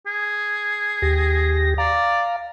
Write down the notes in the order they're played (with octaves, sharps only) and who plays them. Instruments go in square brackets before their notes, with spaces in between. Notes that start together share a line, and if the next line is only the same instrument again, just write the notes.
[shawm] G#4
[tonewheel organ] D#2 G4 A#6
[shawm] D5 [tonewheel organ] F5 A#5